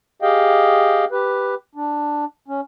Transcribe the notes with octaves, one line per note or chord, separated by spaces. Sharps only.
G4 G#4 D#5 F5 G5
G4 B4
D4
C#4